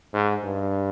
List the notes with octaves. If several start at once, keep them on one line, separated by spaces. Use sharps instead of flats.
G#2
G2